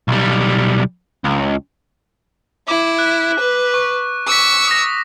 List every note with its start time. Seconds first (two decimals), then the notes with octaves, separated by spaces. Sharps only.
0.08 B1 G3
1.24 C#2
2.68 E4 D6
2.99 F#6
3.40 B4
3.74 C#6
4.27 C#6 D6 E6 B6
4.67 D#6 A#6